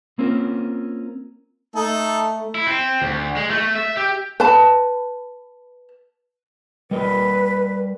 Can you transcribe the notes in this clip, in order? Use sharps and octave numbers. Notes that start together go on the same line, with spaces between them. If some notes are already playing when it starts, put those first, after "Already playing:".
A#3 C4 C#4 F4 A#4
A3 D#4 A4
E4
C4
D2
G#3
A3
E5
G4
B4 A5
G3 A#4 B4 D#5